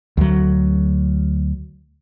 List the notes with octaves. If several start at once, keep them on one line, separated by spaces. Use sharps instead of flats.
D2 F#3